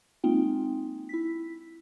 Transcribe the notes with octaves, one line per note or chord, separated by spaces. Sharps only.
G#3 A#3 C4 D#4 F4 G5
E4 B6